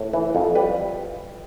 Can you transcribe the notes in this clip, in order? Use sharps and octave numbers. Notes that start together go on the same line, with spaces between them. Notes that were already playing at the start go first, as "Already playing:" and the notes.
Already playing: A2
E3
F2
G3 B4